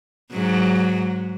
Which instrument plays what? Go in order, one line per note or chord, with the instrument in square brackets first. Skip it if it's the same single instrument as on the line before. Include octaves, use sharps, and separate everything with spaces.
[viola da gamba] G#2 F#3